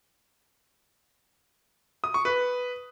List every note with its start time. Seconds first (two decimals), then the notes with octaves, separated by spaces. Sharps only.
2.04 D#6
2.14 C#6
2.25 B4